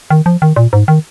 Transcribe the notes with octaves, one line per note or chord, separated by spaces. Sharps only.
D#3
F3
D#3
A#2
G#2
D#3